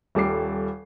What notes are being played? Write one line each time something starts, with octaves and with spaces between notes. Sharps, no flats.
D#1 G3 A4 D6 C7